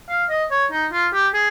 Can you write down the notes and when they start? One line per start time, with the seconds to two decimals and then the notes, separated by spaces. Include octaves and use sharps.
0.09 F5
0.30 D#5
0.51 C#5
0.72 D#4
0.92 F4
1.13 G4
1.34 G#4